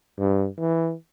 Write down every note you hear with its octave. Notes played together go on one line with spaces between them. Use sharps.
G2
E3